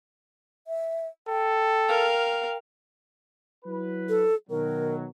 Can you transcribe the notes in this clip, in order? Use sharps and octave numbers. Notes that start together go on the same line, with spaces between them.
E5
A4 G5
A#4 F5
F#3 E4 B4
A4
B2 D#3 F#3 A#4